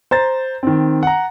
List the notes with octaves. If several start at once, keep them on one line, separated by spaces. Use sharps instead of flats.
C5 A#5 A6
D#3 C4
F#5 A#5